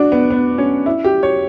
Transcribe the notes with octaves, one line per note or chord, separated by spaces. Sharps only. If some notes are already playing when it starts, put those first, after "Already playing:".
Already playing: D4 F#4
B3
B3
C#4
E4
G4
C#5